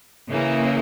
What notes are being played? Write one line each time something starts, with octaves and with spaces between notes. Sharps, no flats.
C#3 E3 A#3